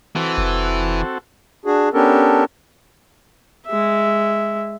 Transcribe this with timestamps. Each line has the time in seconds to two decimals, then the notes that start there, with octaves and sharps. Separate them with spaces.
0.16 E3 C4 F#4 A4
0.38 F1
1.66 D4 F#4 G#4
1.94 B3 C#4 D4 G4 A4 A#4
3.67 G#3 E5